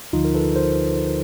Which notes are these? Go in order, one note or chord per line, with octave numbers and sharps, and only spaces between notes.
D2 D3 F3 D#4 F4
A#4
A4 B4
A#4 C5